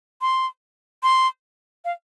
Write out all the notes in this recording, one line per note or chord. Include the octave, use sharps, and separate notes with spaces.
C6
C6
F5